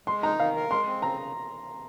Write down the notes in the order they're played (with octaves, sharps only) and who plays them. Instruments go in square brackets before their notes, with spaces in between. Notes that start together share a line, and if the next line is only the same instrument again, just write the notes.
[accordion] G#3 [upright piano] C6
[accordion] D#4 [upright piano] A#5
[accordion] D#3 [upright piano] F5
[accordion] A#4
[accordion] G#3 [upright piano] C6
[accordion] C4
[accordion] C#3 [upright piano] A#5